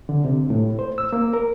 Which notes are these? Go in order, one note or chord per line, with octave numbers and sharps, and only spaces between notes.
D3
C3
A2
C5
E6
A#3
A#4